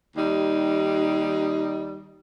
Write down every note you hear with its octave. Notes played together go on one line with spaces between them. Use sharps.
D#2 G3 D#4